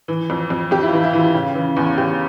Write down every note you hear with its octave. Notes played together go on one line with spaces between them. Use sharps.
E3
F2
F2
F2 G4
E4
F4
E3
E4
E3
F4
C#3
E3
E2
E2 G4